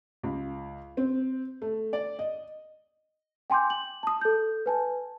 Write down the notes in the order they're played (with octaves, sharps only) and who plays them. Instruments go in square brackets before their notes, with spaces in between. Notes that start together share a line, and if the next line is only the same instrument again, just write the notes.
[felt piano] C#2
C4
A3
D5
D#5
[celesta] G5 G#5 C6 D6 G6
F#7
A5 D#6
A4 G6
B4 G#5 A5